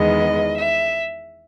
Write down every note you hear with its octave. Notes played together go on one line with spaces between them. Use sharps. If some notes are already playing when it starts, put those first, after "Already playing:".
Already playing: E2 D#3 G#3 B3 D#5
E5